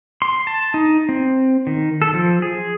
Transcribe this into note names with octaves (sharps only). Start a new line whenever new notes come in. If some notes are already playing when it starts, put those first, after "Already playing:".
C6
A5
D#4
C4
D#3
A4
F3
G#4